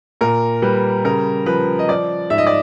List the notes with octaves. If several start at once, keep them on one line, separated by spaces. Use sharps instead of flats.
A#2 A#4
G3 B4
C#3 A#4
F3 B4
D#5
F3 D5
G#2 E5
D#5
D5